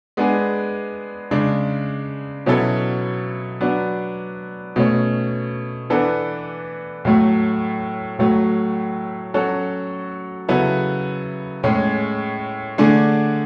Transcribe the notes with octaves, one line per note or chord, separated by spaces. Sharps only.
G#3 B3 D4 G#4
C#3 G#3 D4
B2 F#3 C#4 E4 A4
F#3 B3 D4
B2 A3 C#4
E3 B3 D4 A4
A2 F#3 A3
A2 F#3 A3
F#3 C#4 F#4 A4
C#3 F#3 B3 E4 A4
A2 G#3 C#4 G#4
D3 A3 D4 G#4